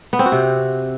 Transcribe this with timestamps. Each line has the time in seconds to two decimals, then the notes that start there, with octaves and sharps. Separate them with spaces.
0.13 B3
0.19 C4
0.26 F#4
0.32 C3